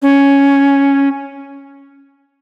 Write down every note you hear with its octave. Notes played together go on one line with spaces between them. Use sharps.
C#4